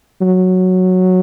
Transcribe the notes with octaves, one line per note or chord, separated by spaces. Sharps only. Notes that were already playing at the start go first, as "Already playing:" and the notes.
F#3